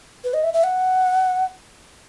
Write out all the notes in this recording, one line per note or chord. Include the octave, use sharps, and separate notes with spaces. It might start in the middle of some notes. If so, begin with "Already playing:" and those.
B4
D#5
E5
E5
F#5